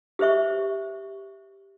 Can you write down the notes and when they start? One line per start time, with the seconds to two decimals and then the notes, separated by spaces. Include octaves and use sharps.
0.19 G4 B4 C5 E5 C#6